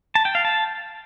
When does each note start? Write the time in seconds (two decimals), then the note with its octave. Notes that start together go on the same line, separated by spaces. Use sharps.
0.15 A5
0.25 G5
0.35 F5
0.45 A5